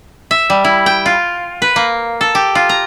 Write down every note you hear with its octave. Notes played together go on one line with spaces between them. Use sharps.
E5
G3
E4
G5
F4
B4
A#3
A4
G4
F4
A#5